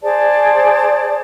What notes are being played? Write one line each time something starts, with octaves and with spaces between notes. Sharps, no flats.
G#4 C5 D5 A5